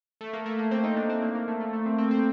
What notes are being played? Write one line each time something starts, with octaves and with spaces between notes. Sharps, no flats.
A3
A#3
A3
A#3
C4
D#4
D4
C4
A#3
A#3
A3
A3
A3
C4
C4
C4